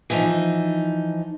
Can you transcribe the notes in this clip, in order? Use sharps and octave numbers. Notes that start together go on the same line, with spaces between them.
E3 F3 D#4